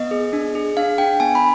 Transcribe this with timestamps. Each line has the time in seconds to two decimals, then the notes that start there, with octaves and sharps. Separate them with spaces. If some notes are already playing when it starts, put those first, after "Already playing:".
Already playing: B3 D#5
0.11 G#4
0.33 D4
0.55 G#4
0.77 D4 F5
0.98 D4 G5
1.20 B3 G#5
1.35 B5